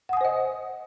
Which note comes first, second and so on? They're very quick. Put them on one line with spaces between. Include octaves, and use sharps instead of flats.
F#5 D#6 G#5 C5 D#5